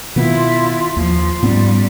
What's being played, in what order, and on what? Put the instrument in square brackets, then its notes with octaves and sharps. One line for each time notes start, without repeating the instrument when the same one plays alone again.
[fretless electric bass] B2 D#3 B3 [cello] E4 [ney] F4
[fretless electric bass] D#2 [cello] F3 [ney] F4
[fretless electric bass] G#2 B3 C#4 [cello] G3